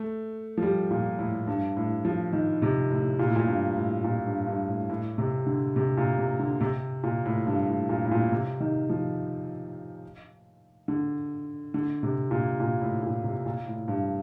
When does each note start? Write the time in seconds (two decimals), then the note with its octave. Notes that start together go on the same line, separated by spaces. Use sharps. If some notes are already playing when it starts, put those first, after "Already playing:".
Already playing: A3
0.57 F3
0.63 G3
0.91 A#2
1.19 A2
1.47 G2
1.77 A2
2.05 F3
2.33 D#3
2.62 C3
2.91 A2
3.19 A#2
3.28 A2
3.36 A#2
3.47 G2
3.76 A2
4.04 A#2
4.26 G2
4.47 G2
4.68 A2
4.90 A2
5.18 C3
5.46 D3
5.76 C3
5.97 A#2
6.18 C3
6.39 D3
6.60 C3
7.03 A#2
7.26 A2
7.47 G2
7.68 A2
7.89 A#2
8.05 A2
8.11 A#2
8.32 C3
8.60 D#3
8.89 F3
10.88 D3
11.74 D3
12.03 C3
12.31 A#2
12.60 A#2
12.81 A2
13.03 A#2
13.24 C3
13.46 A#2
13.67 A2
13.88 G2